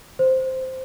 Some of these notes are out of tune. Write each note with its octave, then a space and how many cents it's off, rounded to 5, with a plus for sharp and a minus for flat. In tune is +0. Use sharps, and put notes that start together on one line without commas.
C5 -5